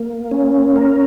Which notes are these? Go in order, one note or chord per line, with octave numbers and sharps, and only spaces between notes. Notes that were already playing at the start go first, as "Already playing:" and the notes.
Already playing: A#3
C#4
A#4